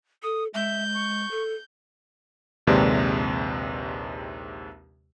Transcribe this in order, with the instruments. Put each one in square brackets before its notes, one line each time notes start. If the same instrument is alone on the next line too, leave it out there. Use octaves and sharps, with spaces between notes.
[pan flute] A4 [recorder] D#6
[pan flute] G#3 [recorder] E5 [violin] G6
[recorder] C#6
[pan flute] A4
[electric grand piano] A#1 D#2 C3 G#3 B4 D5